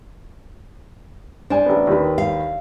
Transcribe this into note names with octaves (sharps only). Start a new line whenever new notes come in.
D4 C5 G#5
A1 B3
D#2 D#3 B4
F5